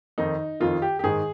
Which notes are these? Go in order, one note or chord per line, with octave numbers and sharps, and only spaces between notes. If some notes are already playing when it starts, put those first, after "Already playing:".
F2 D#3 D#4
F2 D#3 F4
G4
G4
G#2 D#3 G#4